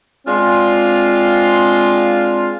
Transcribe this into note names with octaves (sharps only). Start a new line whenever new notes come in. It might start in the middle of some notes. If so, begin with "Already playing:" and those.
G#3 C4 D4 F4